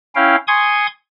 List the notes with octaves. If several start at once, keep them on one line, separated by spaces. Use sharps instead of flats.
C#4 E4 F5 G5
G#5 C6 C#6 D#6 G#6